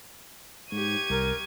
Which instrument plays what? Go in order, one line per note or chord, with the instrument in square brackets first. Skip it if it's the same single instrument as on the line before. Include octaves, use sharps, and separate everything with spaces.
[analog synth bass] G#2 [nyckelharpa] G4 C#6 [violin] G#6 D#7
[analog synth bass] C2 [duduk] A#4